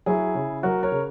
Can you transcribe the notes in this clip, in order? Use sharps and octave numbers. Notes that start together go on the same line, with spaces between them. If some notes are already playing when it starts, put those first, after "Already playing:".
F#3 E4 G#4
C#3
F#3 F#4 A#4
A#4 C#5
C#3